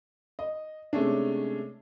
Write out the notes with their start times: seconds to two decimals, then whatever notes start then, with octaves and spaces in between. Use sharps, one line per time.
0.39 D#5
0.93 C3 G#3 A3 C#4 D4